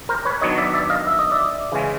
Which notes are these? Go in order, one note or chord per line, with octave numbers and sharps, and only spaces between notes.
A#4 C5
B4 C#5
D#3 F#3 B3 D4 C#5 D#5
D5 E5
D5 E5
D#5 F5
E5
D#5
D5 E5
C#3 E3 G#3 C#4